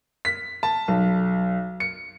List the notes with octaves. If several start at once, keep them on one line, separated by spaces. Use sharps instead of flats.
B6
A5
B1
C#7